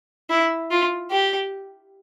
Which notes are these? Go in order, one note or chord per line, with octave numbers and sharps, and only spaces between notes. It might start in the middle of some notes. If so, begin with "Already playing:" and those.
E4
F4
G4